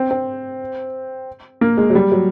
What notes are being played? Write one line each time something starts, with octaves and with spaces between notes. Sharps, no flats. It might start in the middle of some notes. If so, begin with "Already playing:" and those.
Already playing: C4
C4
A#3
G#3
F#3
G3
F#3